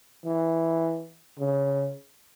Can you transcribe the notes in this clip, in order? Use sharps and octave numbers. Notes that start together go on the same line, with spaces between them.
E3
C#3